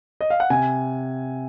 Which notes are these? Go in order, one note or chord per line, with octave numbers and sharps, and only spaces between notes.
D#5
F5
F#5
C3 G#5